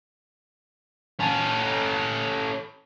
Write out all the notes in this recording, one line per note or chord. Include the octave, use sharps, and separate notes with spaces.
C#4 A4